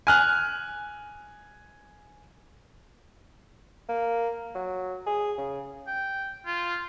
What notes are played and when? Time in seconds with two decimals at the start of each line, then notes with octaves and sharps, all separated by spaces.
0.07 G#5 F6 F#6
3.89 A#3
4.55 F#3
5.06 G#4
5.38 C#3
5.87 G5
6.46 F4